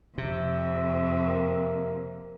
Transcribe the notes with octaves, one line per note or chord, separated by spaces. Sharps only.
F2 C3 E5
A#3